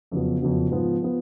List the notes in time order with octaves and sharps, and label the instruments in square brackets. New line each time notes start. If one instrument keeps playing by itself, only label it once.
[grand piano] F2 C#3 F#3 B3
F2 C#3 F#3 B3
G#2 F3 B3
F3 B3